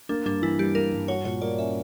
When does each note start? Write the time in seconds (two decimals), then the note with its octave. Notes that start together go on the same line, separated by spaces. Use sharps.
0.09 A#3 D4
0.25 G2 D4
0.42 E3 E4
0.59 G3 G4
0.75 A#3 A#4
0.92 G2
1.08 F#4 C#5
1.25 A#2 C#5
1.42 A#3 D5
1.58 C#4 E5